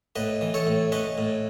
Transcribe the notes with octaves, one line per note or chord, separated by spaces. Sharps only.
A2 B4 D#5
E3
A4 C#5
A2
C#4 B4 D#5
A2